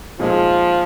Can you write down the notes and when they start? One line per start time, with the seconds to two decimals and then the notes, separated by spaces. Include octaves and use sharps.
0.20 A#2 F3 G#3 D#4 G#4